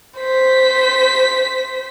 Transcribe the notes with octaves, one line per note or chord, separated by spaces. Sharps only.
C5 B6